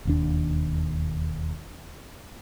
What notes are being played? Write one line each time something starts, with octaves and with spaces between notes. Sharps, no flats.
E1 D#2 D4